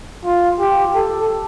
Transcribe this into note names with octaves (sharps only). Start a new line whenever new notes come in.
F4
G4
A4